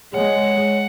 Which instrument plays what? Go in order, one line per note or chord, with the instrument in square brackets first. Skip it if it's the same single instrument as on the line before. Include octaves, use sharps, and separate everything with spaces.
[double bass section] G#3 [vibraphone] C#5 [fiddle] F#5